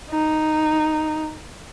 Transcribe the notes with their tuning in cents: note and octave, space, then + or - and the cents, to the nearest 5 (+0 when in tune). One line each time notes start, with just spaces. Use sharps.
D#4 -5